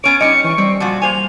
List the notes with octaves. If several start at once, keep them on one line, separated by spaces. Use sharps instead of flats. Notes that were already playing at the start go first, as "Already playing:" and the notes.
B3 C#4 C#5 D7
G3 C#4 D#4 D#5 C#7
E3 C#6
G3 C4
A#2 F3 F#4 A5
A#3 C5 G#5 F7